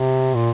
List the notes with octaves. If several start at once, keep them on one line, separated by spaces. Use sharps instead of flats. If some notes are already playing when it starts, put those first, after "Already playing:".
Already playing: C3
A#2